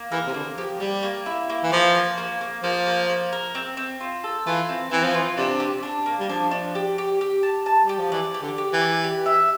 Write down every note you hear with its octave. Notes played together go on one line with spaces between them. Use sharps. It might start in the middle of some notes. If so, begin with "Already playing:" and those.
Already playing: A#3
E3 A#4
C3
D3 A#3
F3 G4
G3 G4
A#3
E4
A#3
E3
F3 A#3
A#3
A#3
A#3
F3 A#3
A#3
A#3
A#4
C4
C4
F4
A4
E3 F4
C4
E3 C4
F3
E3 F4
C3 D4
G4
D4
A#3
G3
F3 D4
D4
G4
G4
G4
A5
A5
G3 G4
F3
E3 D5
G4
D3
G4
E3
D5
G4
E5